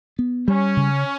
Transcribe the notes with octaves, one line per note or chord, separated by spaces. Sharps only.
B3
G3 C#4
C#3